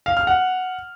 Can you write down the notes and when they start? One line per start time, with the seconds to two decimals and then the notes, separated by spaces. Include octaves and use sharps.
0.06 F5
0.17 F6
0.27 F#5